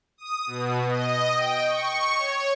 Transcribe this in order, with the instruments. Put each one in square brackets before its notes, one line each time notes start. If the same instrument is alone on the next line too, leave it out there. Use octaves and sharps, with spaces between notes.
[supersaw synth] D#6
B2
D#5
G5
C#6
C#5